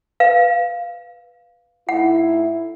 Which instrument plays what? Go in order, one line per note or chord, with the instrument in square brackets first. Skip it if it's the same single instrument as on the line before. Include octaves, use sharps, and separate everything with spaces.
[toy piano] B4 F5
[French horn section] A2 D#4 E4 [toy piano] F#5